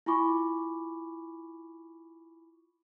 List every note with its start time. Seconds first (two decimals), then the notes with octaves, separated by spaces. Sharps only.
0.06 E4 F4 G#5 B5 C#6 D6